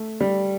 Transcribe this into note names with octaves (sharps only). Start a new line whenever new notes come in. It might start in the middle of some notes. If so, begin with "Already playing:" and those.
Already playing: A3
G3